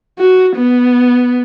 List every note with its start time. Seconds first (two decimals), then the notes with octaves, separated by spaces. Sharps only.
0.19 F#4
0.56 B3